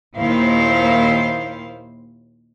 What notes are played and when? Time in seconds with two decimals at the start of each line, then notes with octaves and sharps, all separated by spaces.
0.18 D#2 A#2 D#3 E4 C5 F5